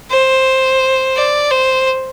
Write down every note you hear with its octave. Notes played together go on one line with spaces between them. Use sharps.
C5
D5
C5